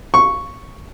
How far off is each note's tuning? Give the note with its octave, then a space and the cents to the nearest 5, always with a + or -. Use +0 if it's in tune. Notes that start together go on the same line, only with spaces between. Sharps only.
C#6 +0